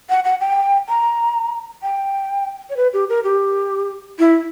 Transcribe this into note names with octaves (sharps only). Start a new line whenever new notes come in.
F#5
F#5
G5
A#5
G5
C#5
B4
G4
A#4
G4
E4